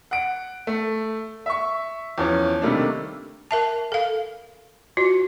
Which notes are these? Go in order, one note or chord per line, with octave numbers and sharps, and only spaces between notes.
F#5 D7
A3
E5 C#6
E2 F3 C#4
C3 D#3 G3 A3 A#3 D4
A#4 E5 A5
A4 F5
F4 F#4